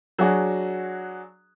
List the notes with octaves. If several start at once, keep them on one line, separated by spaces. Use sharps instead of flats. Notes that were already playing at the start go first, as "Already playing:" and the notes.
F#3 D4 F#4 G#4